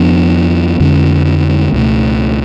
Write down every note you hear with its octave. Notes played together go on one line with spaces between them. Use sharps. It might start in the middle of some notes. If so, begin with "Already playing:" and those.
Already playing: F2 F3 B3 D4
F2 D3 G#3 C#4
C#2 B2 A3